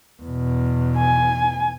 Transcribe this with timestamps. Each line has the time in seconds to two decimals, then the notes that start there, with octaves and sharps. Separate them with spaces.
0.22 E2 B2
0.97 G#5